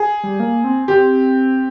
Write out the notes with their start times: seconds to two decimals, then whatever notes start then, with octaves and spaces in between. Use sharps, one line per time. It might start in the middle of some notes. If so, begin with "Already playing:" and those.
Already playing: G#4
0.24 G3
0.40 A#3
0.64 C4
0.88 C4 G4